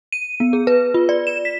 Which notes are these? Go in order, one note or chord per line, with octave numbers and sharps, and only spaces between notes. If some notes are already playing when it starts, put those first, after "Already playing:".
D#7
B3
G#4
B4
F4
D5
E7
B6